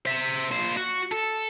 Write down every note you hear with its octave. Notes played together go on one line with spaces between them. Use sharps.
C5 E5
A#2 C5
F#4
A4